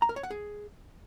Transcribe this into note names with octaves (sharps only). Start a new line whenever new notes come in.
A#5
A#4
C#5
F#5
G#4